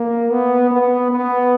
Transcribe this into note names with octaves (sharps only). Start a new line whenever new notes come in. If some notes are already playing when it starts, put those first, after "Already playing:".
Already playing: A#3
B3
B3
B3